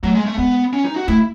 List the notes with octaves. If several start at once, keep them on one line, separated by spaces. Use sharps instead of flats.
F#3 A3
G#3
A3
G#3 B3
C#4
D#4
F#4
A3 E4